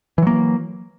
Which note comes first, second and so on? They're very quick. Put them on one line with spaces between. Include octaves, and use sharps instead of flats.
E3 F#3 A#3